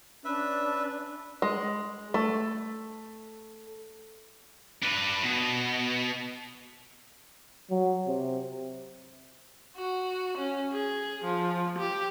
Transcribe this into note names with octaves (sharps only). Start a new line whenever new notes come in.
C#4 D4 B4 E5
G#3
A3
D4 B4
B2
F#3
C3
F#4
C#4
G#4
F3
G4